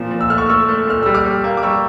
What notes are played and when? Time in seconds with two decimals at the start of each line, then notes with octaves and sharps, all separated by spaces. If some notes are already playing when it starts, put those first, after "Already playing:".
Already playing: A#2 F3
0.11 A#2
0.21 E6
0.30 A3 F6
0.38 C#6 E6
0.50 A3 C#6 E6
0.69 A3
0.87 A#2 F6
1.03 G3 E6
1.14 D6 F6
1.25 G3
1.44 A#3
1.57 D6
1.63 G3 C#6 E6